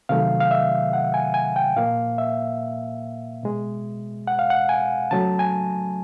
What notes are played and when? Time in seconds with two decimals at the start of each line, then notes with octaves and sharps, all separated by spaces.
0.09 C3 D#3 F#3 A3 F5
0.40 F5
0.51 E5
0.93 F#5
1.14 G#5
1.34 G#5
1.56 G5
1.76 A#2 F3 A#3 F5
2.18 E5
3.43 B2 G#3
4.27 F#5
4.39 F5
4.50 F#5
4.69 G#5
5.11 C#3 F#3 A3 A5
5.39 G#5